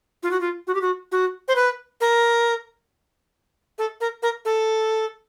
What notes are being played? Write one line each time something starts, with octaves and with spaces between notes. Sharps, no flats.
F4
F#4
F4
F#4
G4
F#4
F#4
C5
B4
A#4
A4
A#4
A#4
A4